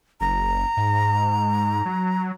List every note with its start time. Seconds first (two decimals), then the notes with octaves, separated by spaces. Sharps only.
0.21 F#1 A#5
0.77 G#2
1.85 F#3